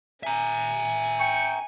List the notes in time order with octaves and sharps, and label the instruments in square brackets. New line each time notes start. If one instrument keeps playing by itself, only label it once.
[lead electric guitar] E5 A#5 [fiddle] G#5
[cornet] G5 [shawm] C#6